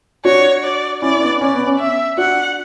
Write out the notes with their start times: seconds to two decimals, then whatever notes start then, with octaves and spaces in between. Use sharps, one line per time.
0.25 D4 F#4 C#5
0.64 D5
1.02 C#4 E4 D5
1.21 B3 D4
1.41 C#4 D5
1.53 B3
1.67 C#4
1.79 E5
2.18 D4 F#4 F#5